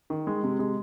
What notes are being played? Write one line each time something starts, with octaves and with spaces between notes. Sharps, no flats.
D#3
G#3
C3
G#3